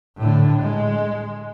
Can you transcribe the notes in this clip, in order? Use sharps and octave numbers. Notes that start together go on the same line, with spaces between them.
A2 D3
G#3